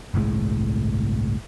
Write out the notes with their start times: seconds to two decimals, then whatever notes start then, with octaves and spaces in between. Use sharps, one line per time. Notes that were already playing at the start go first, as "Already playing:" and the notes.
0.14 G1 C2 A2 G#3